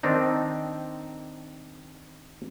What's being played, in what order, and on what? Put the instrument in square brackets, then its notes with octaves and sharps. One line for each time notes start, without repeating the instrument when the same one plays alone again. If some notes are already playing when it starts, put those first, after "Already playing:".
[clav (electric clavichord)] D#3 C4 D4 D#4